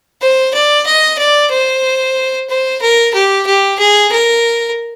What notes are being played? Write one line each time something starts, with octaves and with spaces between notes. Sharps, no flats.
C5
D5
D#5
D5
C5
C5
A#4
G4
G4
G#4
A#4